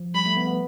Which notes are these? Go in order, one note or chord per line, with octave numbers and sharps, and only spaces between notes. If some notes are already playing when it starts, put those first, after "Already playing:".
Already playing: F3
G3 B5
A3
B3
B3